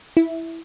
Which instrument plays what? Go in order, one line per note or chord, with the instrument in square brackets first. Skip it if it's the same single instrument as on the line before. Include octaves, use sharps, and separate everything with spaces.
[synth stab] E4